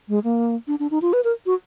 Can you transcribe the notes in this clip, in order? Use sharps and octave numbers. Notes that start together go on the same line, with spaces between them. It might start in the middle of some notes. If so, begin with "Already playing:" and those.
G#3
A#3
D4
D4
D#4
F4
B4
A#4
F#4